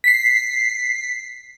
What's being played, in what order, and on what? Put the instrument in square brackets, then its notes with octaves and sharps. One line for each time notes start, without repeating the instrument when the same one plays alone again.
[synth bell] B6 C7